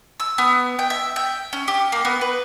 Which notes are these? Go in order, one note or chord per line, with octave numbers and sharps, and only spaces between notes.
E6
B3
G5
E5
G5
C#4
G4
A#3
B3
B4